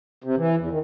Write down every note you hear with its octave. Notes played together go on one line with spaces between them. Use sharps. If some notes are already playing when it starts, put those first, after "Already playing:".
C3
E3
E2
D#3